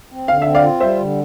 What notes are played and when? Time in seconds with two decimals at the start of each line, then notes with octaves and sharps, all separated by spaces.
0.11 C4
0.28 D3 F5
0.42 C4 E5
0.55 D5 F5
0.63 F4
0.80 G3 C5 E5
0.99 D3